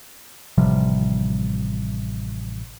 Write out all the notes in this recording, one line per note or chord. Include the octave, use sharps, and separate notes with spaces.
A1 C3 F3 G3